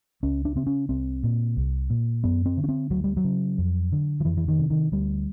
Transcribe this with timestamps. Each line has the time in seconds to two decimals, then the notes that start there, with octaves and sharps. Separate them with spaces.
0.23 C#2 C#4
0.45 D4
0.55 C#3 C4
0.67 C#4
0.89 C2 C4
1.23 A#2
1.57 C2
1.90 A#2
2.24 F#2 B3
2.46 C4
2.57 D3
2.64 C#4
2.69 C4
2.90 D2 F#3
3.04 G3
3.17 F#3
3.24 C#3
3.58 F2
3.92 D3
4.20 F3
4.25 F2 E3
4.37 E3
4.48 D#3
4.59 C3
4.70 D#3
4.92 D2 G3